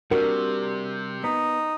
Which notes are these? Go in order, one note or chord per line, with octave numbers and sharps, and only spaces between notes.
C3 G3 D4 F#4 A#4
B3 D#4